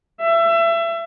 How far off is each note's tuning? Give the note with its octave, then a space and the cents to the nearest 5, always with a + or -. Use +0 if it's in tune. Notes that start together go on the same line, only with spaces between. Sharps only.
E5 +25